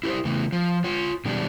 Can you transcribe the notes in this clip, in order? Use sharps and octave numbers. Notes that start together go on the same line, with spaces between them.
E4 G4 B4 C5
C#3 E3 A3
F3
F4 C#5
B2 D#3 F#3 G3 D4